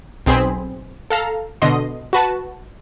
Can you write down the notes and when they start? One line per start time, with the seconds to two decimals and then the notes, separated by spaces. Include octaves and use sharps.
0.26 B1 C4 G#4 C5 B5
1.10 A4 F5 A#5
1.62 B2 D3 D#5 C6
2.13 F#4 B4 A5